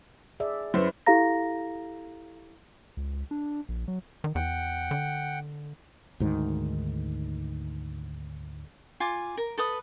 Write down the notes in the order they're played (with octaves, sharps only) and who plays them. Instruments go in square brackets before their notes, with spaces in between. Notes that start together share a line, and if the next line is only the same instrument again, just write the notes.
[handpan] G#4 D5 E5
[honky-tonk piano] F#2 C5 [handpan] E4 B4
[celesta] E4 G4 A4 F5 A#5 A#6
[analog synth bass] C#2
D4
A#1
F#3
D#3
[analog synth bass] E2 [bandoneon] F#5 G5
[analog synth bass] D3
[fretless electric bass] D2 G#2 D#3
[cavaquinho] F4 G#5 D6
A#4
A4 B4 D#6